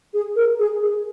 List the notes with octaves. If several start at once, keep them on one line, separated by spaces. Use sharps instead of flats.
G#4
A#4
G#4
G#4